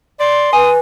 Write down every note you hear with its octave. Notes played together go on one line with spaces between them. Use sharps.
D5 C6
B4 G#5 D#6